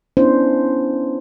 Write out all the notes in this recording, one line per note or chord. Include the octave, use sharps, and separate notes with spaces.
B3 C#4 D4 E4 C5